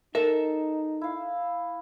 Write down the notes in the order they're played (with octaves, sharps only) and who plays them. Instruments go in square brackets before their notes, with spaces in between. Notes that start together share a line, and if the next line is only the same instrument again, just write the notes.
[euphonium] D#4 [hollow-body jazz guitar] A4 E5 [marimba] A#4
[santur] E4 F5